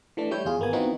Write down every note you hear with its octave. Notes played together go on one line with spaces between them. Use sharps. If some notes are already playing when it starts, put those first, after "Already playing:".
E3 A3 D4
G3 E4 C#5 G6
E2 F4 G#4
G#1 A#3 B3 G#5
E3 B3 C4 D#4 F4 F#4